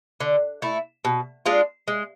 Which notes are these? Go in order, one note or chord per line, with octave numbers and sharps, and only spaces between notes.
D3
A3 E4
B2
G#3 D4 F4
G#3